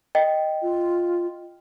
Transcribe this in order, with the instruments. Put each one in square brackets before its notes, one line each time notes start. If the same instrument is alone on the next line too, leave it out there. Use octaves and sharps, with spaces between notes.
[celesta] D#5 G5
[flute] F4